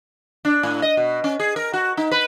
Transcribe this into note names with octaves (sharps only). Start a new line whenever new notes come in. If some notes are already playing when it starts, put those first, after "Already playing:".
D4
A2
D#5
B2
C#4
G#4
A#4
F#4
D#4
B4